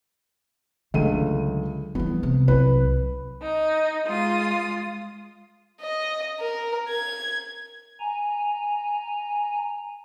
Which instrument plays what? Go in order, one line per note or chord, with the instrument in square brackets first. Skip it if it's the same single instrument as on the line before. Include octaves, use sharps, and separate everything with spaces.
[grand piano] C#2 A3 D#7 [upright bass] D3 F#3
[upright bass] E3 G3 [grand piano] B3
[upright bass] C3
[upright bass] C2 F#3 [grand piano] B4
[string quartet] D#4
G#3 F4 D#6
[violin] D#5
A#4
G#6
[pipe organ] G#5 A#5